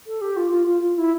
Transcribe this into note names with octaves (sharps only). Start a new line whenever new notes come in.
A4
G4
F4
F4
F4
F4
E4